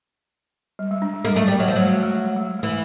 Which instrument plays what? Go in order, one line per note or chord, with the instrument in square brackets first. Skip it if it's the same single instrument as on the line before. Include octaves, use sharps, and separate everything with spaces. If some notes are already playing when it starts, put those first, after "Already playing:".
[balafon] G3
G#3
D4
G#3
[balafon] G3 [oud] A#3
[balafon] F#3 [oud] A3
[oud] G3
[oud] F#3 [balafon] G3
[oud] F3
[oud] F#3 [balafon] G#3
[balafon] A3
G#3
A3
G#3
A3
G#3
A3
[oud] E3 [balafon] G#3